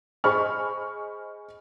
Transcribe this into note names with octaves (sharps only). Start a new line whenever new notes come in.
G#4 C5 D#5 B5 C#6 F6